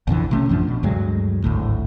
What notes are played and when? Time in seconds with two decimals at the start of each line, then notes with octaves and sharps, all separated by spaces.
0.07 A#1 F2 D3 E3
0.31 C3 A3 C#4
0.49 A1 F#2 F3 D4
0.68 B2
0.83 D2 G2 F#3 G#3
1.44 G#1 D2 A2